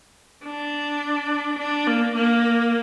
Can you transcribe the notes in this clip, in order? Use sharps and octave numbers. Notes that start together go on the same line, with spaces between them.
D4
D4
A#3
A#3